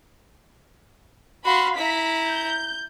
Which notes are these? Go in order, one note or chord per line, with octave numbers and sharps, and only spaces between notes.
F#4 F5 B5 C6
E4 A#5 B6
G6